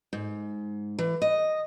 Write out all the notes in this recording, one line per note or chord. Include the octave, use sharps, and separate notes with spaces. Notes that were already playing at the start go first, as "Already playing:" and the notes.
G#2
E3
D#5